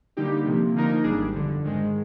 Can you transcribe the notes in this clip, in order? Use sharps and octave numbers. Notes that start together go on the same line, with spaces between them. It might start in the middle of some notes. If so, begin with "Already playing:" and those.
D3 G3 A#3 D#4 G4
C3 F3 A#3
D3 F3 A#3 D#4 A#4
G#1 G#2 G3 D4 G#4
G1 F2 D3
G#2 D#3 G#3